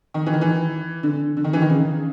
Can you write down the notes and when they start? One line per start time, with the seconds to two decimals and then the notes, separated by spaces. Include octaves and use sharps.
0.14 D#3
0.26 E3
0.33 D#3
0.41 E3
1.03 D3
1.37 D3
1.44 D#3
1.53 E3
1.62 D#3
1.70 C#3